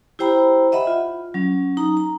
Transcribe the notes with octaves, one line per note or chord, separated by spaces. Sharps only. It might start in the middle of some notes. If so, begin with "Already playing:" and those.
E4 G4 C5 G5 A#5 B5
D#5 E5 F#5 B5
F4
F#3 C#4
D#4 A#5
A#5